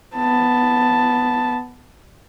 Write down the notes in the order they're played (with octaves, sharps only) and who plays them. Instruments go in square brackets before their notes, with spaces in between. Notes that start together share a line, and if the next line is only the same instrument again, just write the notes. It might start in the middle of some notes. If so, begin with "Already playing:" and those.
[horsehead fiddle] B3 A5